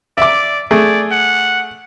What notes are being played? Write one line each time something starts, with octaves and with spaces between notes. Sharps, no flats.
D5 E5 D6
A3 G#4 D5
F#5